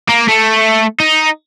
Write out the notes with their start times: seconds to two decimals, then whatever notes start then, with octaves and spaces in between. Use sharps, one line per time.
0.09 A#3
0.28 A3
1.00 D#4